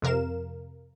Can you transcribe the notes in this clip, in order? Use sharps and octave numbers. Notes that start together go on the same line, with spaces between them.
F2 C3 A#4 F5 E7